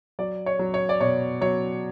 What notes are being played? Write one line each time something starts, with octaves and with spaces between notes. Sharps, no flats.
F#3 D5
C#5
F#3
C#5
D5
B2 C#5
F#3 C#5